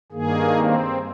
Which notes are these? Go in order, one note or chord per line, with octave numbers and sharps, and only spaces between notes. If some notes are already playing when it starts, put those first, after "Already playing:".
G2 D#3 A#3 G#4
C4